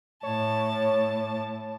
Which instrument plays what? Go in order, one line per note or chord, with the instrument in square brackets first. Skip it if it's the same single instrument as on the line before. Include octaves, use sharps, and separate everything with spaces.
[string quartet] A2 A5 [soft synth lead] C#5